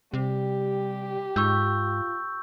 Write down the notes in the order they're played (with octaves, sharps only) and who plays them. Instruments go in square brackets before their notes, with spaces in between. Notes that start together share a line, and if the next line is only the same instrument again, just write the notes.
[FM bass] C3 [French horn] G3 [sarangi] G4
[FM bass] G#2 [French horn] F4 [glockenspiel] C#6 E6 G6